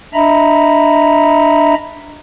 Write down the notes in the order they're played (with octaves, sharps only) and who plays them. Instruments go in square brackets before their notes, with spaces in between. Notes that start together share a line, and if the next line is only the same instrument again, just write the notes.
[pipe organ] D4 D#5 E5 A#5 B5